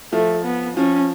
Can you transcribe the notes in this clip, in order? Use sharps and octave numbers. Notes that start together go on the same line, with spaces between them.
F3 A3
B3
F3 C#4